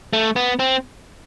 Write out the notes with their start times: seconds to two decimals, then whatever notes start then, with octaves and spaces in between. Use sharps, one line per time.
0.13 A3
0.36 B3
0.59 C4